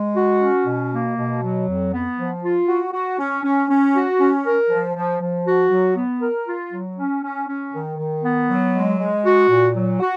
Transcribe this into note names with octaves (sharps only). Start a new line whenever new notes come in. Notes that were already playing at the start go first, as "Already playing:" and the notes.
Already playing: G#3
F#4
C#4
B2
A#3
B2
F#3
F2
B3
F3
F4
F#4
F#4
C#4
C#4
C#4
F#4
C#4
A#4
F3
F3
F3
F#4
F#3
B3
A#4
F4
F#3
C#4
C#4
C#4
D#3
D#3
B3
F#3
G#3
G#3
F#4
A#2
F#3
F#4